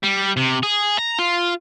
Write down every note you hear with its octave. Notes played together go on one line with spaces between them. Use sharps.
G3
C3
G#4
A#5
F4